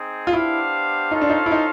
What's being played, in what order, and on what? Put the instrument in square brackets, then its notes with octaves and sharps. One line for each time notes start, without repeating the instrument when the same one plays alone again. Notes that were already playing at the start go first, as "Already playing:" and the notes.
Already playing: [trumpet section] C4 D#4 G#4
[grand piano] F4
[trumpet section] B3 D4 G4 C5 F5 [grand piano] E4
[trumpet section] C#4 F4 A4 C5 F5 [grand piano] D#4
[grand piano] D4
D#4
E4
D#4